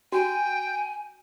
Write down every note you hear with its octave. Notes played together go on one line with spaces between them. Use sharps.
F#4 G5 G#5